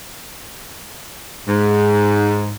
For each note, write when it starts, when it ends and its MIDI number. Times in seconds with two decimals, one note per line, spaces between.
1.47 2.54 44